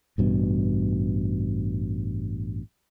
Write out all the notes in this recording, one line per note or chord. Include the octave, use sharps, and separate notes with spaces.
A1 G2 B2